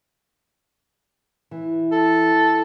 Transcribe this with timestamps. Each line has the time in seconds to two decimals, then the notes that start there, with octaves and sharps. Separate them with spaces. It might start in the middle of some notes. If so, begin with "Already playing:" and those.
1.51 E3
1.92 A4